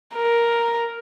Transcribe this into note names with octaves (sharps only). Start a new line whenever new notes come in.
A#4